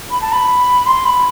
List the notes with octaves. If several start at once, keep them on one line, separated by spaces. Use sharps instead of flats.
B5
A5
B5
C6
B5